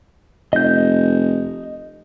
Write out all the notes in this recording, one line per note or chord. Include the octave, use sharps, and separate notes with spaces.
F1 D#5 G6